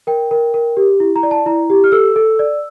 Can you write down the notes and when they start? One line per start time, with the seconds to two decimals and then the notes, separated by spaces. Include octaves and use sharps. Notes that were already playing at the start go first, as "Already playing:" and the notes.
0.07 A#4 G5
0.31 A#4
0.54 A#4
0.77 G4
1.00 E4
1.16 A#5
1.23 D5
1.31 A5
1.46 E4 A#5
1.70 G4
1.84 F6
1.92 A4 E6
2.16 A4
2.39 D5